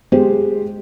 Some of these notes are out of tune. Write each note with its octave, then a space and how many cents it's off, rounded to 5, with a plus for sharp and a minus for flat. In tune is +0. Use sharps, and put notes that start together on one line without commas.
G#3 +0 G4 +0 C5 +0